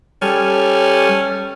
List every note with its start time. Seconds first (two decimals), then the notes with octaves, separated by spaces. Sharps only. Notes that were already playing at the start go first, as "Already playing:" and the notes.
0.22 G3 C#4 A4 F6